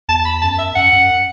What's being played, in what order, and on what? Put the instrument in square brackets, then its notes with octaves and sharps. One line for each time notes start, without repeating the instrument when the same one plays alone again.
[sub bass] E2 [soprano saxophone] A5
[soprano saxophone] B5
[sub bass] F#2 [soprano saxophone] A5
[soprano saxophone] E5
[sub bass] F#2 [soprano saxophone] F#5
[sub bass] F#2